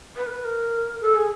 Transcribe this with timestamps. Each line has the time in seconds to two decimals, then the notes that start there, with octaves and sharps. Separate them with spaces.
0.15 B4
0.26 A#4
0.29 B4
0.44 A#4
1.00 A4
1.15 G#4